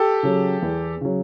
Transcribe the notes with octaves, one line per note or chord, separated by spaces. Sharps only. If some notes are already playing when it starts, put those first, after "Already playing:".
Already playing: G4 A4
C#3 F#3
E2
C#3 F#3